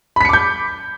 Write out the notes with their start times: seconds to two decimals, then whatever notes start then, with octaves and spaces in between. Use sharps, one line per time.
0.16 B5
0.21 B6
0.25 C#7
0.29 D6
0.33 G6